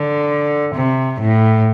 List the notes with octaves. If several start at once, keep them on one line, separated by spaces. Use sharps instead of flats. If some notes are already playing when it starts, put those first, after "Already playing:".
Already playing: D3
C3
A2